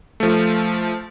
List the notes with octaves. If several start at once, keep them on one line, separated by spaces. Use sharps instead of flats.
F3 A3